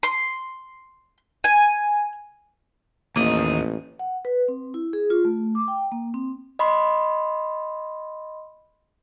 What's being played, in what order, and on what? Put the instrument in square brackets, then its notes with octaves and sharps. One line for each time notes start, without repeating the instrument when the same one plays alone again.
[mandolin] C6
G#5
[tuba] A1 [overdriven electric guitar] D#2 D#5 [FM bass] A#3
[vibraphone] F#5
B4
C4
E4
G#4
F4
A3
D6
G5
A#3
C4
[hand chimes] D#5 B5 C6